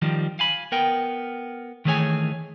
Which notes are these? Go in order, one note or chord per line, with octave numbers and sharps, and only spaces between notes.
D#3 F3 G3
F5 G#5 B5
B3 A#4 G5
D#3 E3 A3 G#4 C#5 G#5